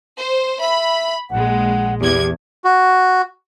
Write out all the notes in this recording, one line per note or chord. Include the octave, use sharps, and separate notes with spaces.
C5
E5 B5
A#1 G#3 F#5
E2 G4 G#6
F#4